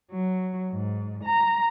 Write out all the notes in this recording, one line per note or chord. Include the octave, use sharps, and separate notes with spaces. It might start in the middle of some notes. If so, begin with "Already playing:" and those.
F#3
G#2
A#5